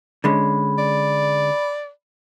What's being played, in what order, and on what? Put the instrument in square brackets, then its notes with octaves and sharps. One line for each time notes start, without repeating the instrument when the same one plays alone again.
[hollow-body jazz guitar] D3 G#3 C#4 [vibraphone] B5
[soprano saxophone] D5